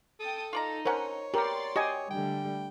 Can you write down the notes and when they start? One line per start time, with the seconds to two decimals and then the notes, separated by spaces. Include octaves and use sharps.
0.20 A4 G5 A5 D#6
0.53 D#4 F4 D5 A#5
0.85 D3 C#4 A#4 C5 C#5 F#5
1.34 F#3 B3 G4 A#4 D5 C6 A6
1.76 F#4 G4 D#5 G#5
2.10 D3 G3 A3 G5